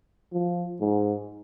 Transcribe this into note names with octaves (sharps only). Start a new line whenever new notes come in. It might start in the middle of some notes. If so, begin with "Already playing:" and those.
F3
G#2